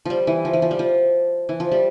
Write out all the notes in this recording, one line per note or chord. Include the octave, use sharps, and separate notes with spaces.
F3 G3
E3
F3
E3
F3
G3
F3
E3
F3
G3